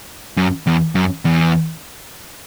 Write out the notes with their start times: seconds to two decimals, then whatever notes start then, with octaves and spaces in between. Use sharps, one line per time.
0.37 F#2
0.67 E2
0.95 F#2
1.25 E2